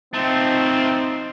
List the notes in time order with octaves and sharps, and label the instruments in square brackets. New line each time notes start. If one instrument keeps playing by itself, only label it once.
[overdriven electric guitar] F3 A3 [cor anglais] C4 [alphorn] D#4